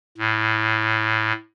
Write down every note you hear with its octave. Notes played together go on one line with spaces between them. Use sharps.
A2